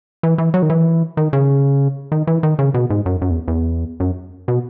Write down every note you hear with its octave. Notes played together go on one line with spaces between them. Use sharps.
E3
E3
F#3
D#3
E3
D#3
C#3
D#3
E3
D#3
C#3
B2
G#2
F#2
F#2
E2
E2
F#2
B2